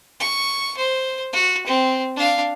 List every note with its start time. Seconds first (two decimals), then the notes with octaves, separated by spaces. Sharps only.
0.20 C#6
0.77 C5
1.33 F#4
1.67 C4
2.16 D4 F5